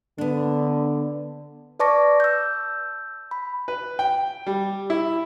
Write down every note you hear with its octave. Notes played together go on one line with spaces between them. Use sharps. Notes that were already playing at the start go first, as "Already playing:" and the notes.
D3 B3 D4
B4 D5 A5 C#6 D6 A#6
E6 G6
B5
B4
G5
G3
E4